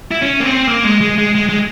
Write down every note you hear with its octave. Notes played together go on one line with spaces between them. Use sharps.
E4
C#4
A#3
C4
A#3
G#3
G#3
G#3
G#3
G#3